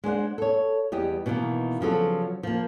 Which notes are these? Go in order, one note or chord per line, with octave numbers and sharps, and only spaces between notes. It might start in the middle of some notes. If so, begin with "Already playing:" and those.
G#3 D4 C5 F#5
A4 C#5
E2 G3 G4 D#5
B2 D#3 E3 A#3
C#3 F3 F#3 A4
F3 A#3